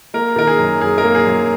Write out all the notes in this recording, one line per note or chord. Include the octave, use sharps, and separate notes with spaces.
A#3 A#4
D#3 A#4
G#4
F#2
F#2 G#4
A#4
A#3
G#4
F#2